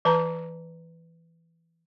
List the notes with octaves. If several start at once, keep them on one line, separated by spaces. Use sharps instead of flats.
E3 B4 A5 A#5